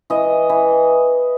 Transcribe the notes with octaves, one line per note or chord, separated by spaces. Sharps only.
E3 D#5
E3